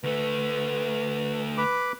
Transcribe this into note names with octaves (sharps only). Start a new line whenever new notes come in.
D2 A3 B4
B4 B5 D6